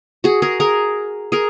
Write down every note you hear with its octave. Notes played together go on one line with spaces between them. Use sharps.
F#4 G#4
G#4 A#4
G#4 A#4
G#4 A#4